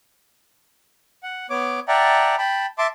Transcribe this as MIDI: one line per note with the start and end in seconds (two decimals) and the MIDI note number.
1.23 1.46 78
1.50 1.80 59
1.50 1.80 73
1.50 1.80 86
1.88 2.36 74
1.88 2.36 76
1.88 2.36 78
1.88 2.36 79
1.88 2.36 81
1.88 2.36 82
2.38 2.66 79
2.38 2.66 81
2.38 2.66 83
2.78 2.87 76
2.78 2.87 81
2.78 2.87 84
2.78 2.87 86